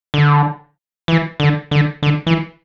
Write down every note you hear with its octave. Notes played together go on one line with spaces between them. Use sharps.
D3
E3
D3
D3
D3
E3